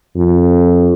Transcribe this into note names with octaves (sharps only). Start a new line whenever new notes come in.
F2